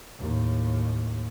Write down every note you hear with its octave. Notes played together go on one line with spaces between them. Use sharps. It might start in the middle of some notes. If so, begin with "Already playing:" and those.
D#2 A2